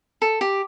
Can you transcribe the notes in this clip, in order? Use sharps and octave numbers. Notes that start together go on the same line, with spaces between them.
A4
G4